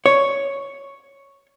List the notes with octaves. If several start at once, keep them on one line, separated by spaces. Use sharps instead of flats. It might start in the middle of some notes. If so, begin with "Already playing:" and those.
C#5